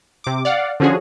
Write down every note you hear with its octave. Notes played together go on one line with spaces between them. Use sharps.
C3 D6
D5 F5 F#5
D3 F3 C#4 F#4 G#4